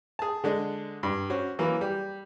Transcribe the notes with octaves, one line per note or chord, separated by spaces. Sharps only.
G#4 A5
D3 G#3 D4
G2
C#4 F#4 C5
E3 F#3 A#3
G3